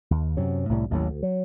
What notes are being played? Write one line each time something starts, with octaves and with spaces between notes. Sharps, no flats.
D#2
F#2 C3 F#3
C2 A2 F3 G3
A1 D#2 A2 F#3
D2
F#3